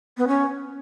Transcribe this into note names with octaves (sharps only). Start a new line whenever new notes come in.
B3
C#4